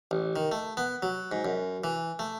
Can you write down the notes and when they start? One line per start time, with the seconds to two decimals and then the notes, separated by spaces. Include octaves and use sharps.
0.11 A1
0.36 D#3
0.52 A3
0.77 B3
1.02 F#3
1.32 G#2
1.45 F#2
1.84 E3
2.19 A3